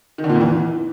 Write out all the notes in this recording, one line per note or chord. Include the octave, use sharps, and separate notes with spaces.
D#3
D3
A#2
F2
E3